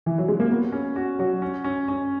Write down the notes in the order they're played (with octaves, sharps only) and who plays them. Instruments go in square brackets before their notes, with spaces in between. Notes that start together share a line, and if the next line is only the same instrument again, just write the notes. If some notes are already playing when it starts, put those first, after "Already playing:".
[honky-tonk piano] E3
F#3
G#3
A#3
[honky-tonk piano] B3 [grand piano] F#4
[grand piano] C#4
F#4
[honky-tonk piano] F#3 [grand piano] F#4
[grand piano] C#4
C#4
C#4